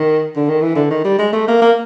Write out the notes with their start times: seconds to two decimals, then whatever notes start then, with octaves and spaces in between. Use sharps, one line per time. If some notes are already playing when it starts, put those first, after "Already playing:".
Already playing: D#3
0.36 D3
0.49 D#3
0.62 E3
0.76 D3
0.91 D#3
1.04 G3
1.19 G#3
1.33 A3
1.48 A#3
1.62 A#3